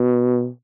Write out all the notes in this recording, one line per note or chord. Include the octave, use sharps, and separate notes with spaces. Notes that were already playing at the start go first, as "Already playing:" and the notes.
Already playing: B2